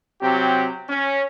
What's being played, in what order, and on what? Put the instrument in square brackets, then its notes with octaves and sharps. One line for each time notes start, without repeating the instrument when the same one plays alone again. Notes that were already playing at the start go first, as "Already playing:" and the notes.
[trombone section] C3 F#3 C4 G4
C#4